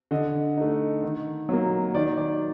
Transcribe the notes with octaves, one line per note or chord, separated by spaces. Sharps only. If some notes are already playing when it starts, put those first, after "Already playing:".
D3 D#5
A3 D#4
D#3
F#3 A#3
D#3 D5
D5